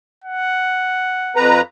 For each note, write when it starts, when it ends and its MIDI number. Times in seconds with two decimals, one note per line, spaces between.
0.24 1.51 78
1.36 1.61 41
1.36 1.61 71
1.36 1.61 82